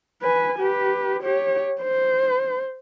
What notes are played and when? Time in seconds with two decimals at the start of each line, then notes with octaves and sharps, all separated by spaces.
0.22 B4 G#5
0.59 G4 B4
1.23 G4 C#5
1.81 C5